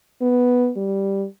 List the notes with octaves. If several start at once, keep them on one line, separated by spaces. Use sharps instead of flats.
B3
G3